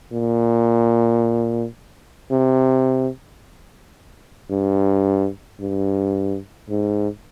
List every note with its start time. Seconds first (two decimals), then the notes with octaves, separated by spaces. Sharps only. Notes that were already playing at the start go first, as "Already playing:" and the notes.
0.12 A#2
2.31 C3
4.50 G2
5.60 G2
6.69 G#2